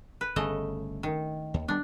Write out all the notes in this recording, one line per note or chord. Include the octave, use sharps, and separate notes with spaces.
B4
G1 C#3 A3 D#5
D#3
D#2
G3 B3 D4